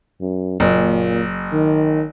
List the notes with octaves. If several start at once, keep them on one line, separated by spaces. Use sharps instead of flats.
F#2
F#1 A#2
D#3